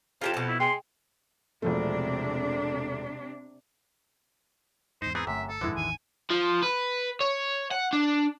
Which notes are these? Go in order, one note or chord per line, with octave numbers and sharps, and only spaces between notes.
F2 F4 G4 A5
B2 A5
E4
G#3 G5 C6
E1 C3 F3 A3 D4
E2 G#2 D#4 C5
E3 B3 C4 G#4 A#5
G1 F#2 C3 A3 E5
A4
D#1 F2 G#2 D3 G#3 E4 B4
A1 E2 D#3 G#5
F3
B4
C#5
F#5
D4